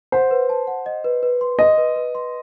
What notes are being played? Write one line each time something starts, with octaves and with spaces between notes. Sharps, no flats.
C5 F#5
B4
A5
F#5
D#5
B4
B4
C6
D#5 C6
B4
B4
C6